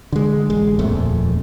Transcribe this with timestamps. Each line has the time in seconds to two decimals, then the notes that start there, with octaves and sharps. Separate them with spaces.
0.12 D3 G#3
0.50 A1 G#3
0.79 D#1 A#1 F2 A3